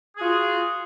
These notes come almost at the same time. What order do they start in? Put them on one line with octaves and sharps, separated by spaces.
G#4 F#4 F4